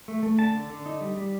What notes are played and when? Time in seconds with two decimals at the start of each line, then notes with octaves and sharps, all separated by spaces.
0.08 A3
0.23 A3
0.38 D3 A5
0.55 D3
0.70 D3
0.86 D#4
1.01 G3
1.17 G3